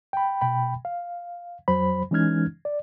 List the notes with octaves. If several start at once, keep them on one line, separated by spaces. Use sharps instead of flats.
G5 B5
B2 G5 B5
F5
F2 F#3 C5 B5
E3 G#3 C#4 D#4 F6 G#6
D5